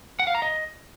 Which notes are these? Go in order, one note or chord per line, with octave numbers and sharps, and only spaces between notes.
F#5
F5
A#5
D#5